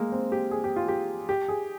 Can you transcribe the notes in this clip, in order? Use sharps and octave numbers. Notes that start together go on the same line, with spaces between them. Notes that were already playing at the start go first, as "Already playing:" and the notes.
Already playing: G#3 A#3
C4
G4
G#4
G4
F4
G4
G4
G#4